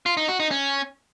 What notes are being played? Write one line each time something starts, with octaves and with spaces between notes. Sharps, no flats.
F4
D#4
F#4
D#4
C#4